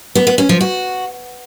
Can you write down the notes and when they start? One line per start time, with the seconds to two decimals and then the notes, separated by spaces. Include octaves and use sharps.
0.15 B3
0.27 B3
0.38 C#4
0.49 F3
0.61 F#4